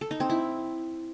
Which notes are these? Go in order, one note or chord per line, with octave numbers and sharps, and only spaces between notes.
A4
D#4
C4
E4